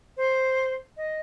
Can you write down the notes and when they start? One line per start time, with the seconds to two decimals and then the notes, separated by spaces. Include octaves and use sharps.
0.17 C5
0.97 D#5